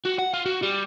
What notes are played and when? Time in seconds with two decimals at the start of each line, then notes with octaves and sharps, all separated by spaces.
0.06 F#4
0.19 F#5
0.34 F4
0.46 F#4
0.62 G3